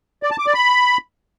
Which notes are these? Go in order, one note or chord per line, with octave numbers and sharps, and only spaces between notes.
D5
A5
D6
D5
B5